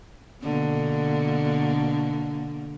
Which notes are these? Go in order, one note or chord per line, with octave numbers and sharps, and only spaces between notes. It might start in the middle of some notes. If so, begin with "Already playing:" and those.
B2 D3 A#3